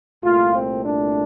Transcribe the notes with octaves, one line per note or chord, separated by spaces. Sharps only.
C2 A#2 A3 F4
C4
D4